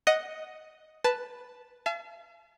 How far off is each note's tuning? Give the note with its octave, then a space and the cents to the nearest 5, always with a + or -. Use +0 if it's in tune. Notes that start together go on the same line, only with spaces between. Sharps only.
D#5 +5 F#5 +0
B4 +0 A5 +0
F5 -45 A5 -40